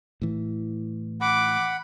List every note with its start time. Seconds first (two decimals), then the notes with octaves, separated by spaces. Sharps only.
0.22 A2 E3
1.21 F#5 B5 D6